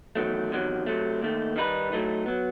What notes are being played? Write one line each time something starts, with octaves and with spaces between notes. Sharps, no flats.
E2 D#3 F#3 A3
E2 C3 D#3 F#3
C3 F#3 A3
D#2 D#3 A3
D#3 G3 D#4 G4 B4
A2 F#3 A3 D#4
F#3 B3